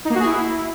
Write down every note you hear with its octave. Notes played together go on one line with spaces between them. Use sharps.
D#4
A#3
F#4
G#4
E4